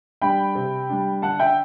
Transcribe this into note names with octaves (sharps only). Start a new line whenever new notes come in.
G3 D4 G5 B5
C3
G3 D4
D3 F#5 A5
E5 G5